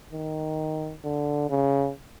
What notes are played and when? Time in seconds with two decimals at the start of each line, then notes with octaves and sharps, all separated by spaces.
0.13 D#3
1.04 D3
1.50 C#3